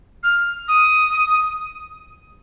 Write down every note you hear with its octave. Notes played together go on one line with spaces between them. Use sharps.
F6
D#6